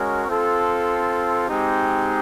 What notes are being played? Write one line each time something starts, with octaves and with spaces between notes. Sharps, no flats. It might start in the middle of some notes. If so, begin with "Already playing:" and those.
Already playing: G#3 C#4 F#4 A#4 C#5
C4 F4 A4
G#3 C4 D#4 G4